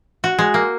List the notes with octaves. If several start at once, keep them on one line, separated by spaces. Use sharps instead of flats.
F#4
G#3
A#3